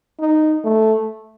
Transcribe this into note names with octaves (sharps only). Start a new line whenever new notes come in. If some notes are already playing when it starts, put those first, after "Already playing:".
D#4
A3